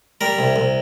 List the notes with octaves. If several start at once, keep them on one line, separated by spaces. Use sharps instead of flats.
G3 A#4
C2
C2